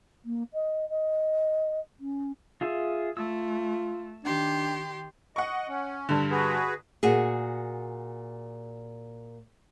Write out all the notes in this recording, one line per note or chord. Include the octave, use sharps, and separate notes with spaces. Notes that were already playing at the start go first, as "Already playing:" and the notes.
A#3
D#5
D#5
C#4
F4 G#4 E5
A3 F4 E6
D#3 D4 G4 C6
D#5 F#5 C#6
C#4
G2 D3
F#4 G#4 B4
A#2 F#4 G#4